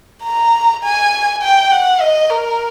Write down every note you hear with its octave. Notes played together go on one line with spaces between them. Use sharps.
A#5
G#5
G5
F#5
D#5
A#4